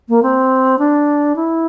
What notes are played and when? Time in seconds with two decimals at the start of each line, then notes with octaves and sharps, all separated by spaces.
0.08 A#3
0.22 C4
0.78 D4
1.35 E4